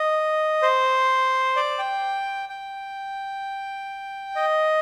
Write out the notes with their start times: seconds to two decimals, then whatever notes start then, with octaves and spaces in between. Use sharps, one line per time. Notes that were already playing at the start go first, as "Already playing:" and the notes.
Already playing: D#5
0.62 C5
1.56 D5
1.79 G5
2.49 G5
4.36 D#5